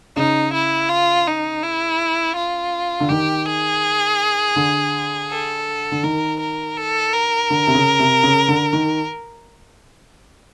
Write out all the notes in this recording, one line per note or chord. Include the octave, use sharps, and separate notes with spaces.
C#3 D#4
E4
F4
D#4
E4
F4
D3
D#3 G4
G#4
D3
A4
D3
D#3 A#4
A#4
A4
A#4
D3
C3
C#3
C3
C#3
D3
D#3